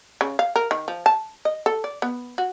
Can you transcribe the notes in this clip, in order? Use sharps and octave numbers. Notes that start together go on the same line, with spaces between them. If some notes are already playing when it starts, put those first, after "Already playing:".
C#3
F5
A#4
D#3
F3
A5
D#5
A4
D5
B3
F#4